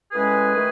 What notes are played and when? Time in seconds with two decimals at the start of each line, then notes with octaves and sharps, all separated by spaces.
0.12 A2 G#3 C#4 G#4 B4
0.54 D#3 A3